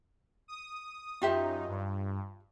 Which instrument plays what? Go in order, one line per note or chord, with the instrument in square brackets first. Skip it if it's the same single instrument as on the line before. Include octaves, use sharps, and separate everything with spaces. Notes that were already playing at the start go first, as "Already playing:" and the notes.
[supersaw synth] D#6
[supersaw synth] F#2 D#4 [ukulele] F4 G4 E5
[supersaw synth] G2